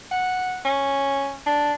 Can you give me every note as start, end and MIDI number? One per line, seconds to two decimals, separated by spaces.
0.11 0.59 78
0.65 1.38 61
1.46 1.73 62